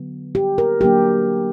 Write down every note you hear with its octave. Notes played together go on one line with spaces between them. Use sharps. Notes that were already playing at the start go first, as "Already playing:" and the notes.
Already playing: D3 F#3 B3
G4
A#4
D3 F#3 A#3 D4 G4